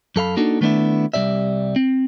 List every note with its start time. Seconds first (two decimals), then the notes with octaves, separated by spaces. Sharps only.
0.16 F#2 A4 F5 B5
0.37 A#3 D4 D#4 F#4 A4
0.61 D#3 A3 B3 D4 E4
1.14 C2 B2 G3 D5 E5
1.76 C4